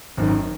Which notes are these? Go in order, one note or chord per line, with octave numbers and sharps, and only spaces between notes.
G#1 F#2 D#3